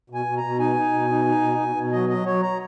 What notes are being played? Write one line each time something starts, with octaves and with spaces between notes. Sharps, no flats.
B2 G#5
B2
A#5
B2
D#4 G#5
D#4
B2
D#4
D#4
B2
B2
B2
F#3 D#5
F#3 D#5
F#3 C#5
A#5